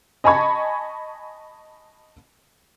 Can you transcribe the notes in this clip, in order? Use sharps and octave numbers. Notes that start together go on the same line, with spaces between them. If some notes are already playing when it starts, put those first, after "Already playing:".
D#5 G#5 A5 B5 C#6 G#6